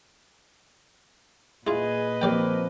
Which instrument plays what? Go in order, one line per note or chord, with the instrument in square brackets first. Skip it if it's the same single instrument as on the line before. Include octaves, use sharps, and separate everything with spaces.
[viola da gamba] A#2 B4 D#5 [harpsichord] E4 F4 [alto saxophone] G#4
[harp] F3 C4 [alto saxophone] A#3 [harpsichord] G4 D5 G5